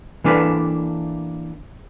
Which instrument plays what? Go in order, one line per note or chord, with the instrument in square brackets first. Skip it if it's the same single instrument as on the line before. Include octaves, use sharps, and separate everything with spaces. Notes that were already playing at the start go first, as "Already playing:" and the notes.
[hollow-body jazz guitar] E3 A#3 D4 A4 B4